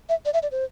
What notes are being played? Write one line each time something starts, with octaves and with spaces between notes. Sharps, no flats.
E5
D5
E5
D5
C5